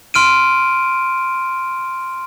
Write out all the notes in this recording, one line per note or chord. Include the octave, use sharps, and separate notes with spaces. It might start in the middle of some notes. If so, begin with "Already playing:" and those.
C6 F6 D7 D#7